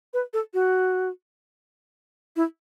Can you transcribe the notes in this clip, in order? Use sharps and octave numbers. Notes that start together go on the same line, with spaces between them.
B4
A4
F#4
E4